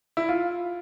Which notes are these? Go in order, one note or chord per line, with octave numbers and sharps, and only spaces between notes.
E4
F4